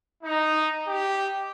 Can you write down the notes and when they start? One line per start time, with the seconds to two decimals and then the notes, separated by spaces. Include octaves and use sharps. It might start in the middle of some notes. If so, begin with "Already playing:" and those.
0.23 D#4
0.87 G4